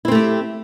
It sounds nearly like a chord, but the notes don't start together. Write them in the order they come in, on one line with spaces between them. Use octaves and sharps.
E4 C4 A3 G4